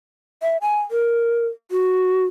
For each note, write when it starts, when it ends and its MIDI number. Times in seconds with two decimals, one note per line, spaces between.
0.42 0.57 76
0.62 0.79 80
0.91 1.46 70
1.71 2.23 66